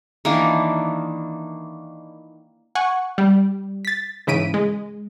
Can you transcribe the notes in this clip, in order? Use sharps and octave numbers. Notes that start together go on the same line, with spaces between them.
D#3 E3 A#3 D4
F#5 G#5 C#6
G3
A6 B6
G#2 C#3 E3 B6 D7 D#7
G#3